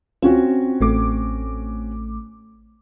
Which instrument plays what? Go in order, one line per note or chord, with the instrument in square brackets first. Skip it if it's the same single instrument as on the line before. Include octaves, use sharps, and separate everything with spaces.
[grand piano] C4 C#4 F#4 [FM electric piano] F4
[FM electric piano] A1 A3 D6